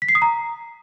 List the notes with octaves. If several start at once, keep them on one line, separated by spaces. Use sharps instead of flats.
B6
C7
D#6
A#5